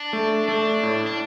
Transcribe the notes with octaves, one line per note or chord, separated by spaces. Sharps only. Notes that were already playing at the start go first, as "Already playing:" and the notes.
Already playing: D4
A3
A3 D4
A2
D4